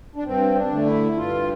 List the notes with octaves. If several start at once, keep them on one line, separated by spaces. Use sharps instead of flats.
D4
G2 C4
D4
D3 A3
E4
G2 F4